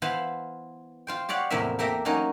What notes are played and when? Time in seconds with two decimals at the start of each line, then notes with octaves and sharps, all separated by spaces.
0.02 E3 B3 C5 F5 A5 B5
1.07 F4 C5 G5
1.29 G4 C#5 D5 F5 F#5
1.50 E2 A2 C3 F3 A#3 E5
1.79 A#3 G4 A4 E5 G5 A#5
2.05 F#3 A#3 C#4 D#4